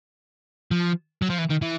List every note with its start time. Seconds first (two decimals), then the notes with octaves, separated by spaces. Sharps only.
0.71 F3
1.22 F#3
1.30 F3
1.39 E3
1.50 D#3
1.62 E3